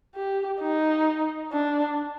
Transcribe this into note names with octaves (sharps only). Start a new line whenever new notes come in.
G4
D#4
D4